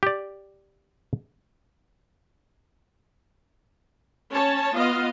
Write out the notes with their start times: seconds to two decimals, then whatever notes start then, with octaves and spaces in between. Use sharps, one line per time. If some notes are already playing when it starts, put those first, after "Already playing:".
0.03 G4 D5
4.32 C#4 C#5 A5
4.74 B3 F4 D#5 F5